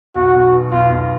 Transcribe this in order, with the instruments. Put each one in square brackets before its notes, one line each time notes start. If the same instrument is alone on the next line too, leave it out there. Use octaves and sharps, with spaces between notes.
[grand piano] B1 [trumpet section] F#4
[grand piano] B1
B2
[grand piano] B1 [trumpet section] F4
[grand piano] B1